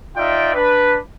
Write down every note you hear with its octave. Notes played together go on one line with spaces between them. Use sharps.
D#4 F4 D5 E5 G5
D4 B4